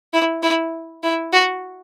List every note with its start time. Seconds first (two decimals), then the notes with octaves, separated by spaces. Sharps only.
0.13 E4
0.43 E4
1.03 E4
1.33 F#4